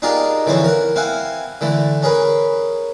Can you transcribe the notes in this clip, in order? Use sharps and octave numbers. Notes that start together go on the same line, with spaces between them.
D4 D#4 F4 G4 G#4 A#4
D3 E3 F3 C4 C#4
A#4 F#5
C4 E4 F5 F#5 G#5
D3 E3 A3
C#4 G#4 A#4 B4 B5